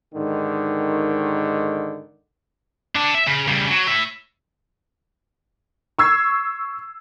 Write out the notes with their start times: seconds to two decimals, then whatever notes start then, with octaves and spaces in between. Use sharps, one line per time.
0.15 G#2 D3 D#3
2.96 D4 A4
3.15 E5
3.27 C#3
3.48 C#3 G3
3.69 F#3
3.87 A2 E5
5.99 C#6 E6 G#6 C7